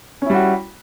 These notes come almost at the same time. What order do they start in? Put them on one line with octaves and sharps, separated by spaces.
C#4 E4 G3 F#4